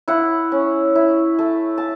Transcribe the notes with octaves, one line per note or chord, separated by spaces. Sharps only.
E4 F#5
C#4
E4
A3
A5